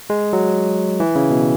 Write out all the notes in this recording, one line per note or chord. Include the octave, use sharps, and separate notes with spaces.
G#3
F#3
E3
C#3
B2